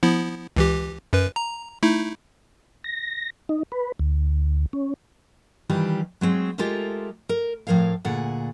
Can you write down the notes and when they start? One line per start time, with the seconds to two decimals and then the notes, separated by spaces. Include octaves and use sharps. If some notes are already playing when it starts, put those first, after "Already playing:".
0.03 F3 B3 E4
0.56 C#2 E3 G4
1.13 F#2 B4
1.36 A#5
1.83 A3 D#4 E4
2.84 A#6
3.49 D#4
3.72 B4
3.99 D2
4.73 C#4
5.70 D#3 E3 G3 F4 G4
6.21 F#3 G#3 C4 C#5
6.58 G#3 F4 G4 A4 A#4 E5
7.29 A#4
7.67 A2 F3 A#4 C#5 F5
8.05 D2 A#2 G#4 F#5